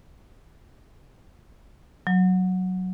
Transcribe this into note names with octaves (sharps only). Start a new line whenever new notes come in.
F#3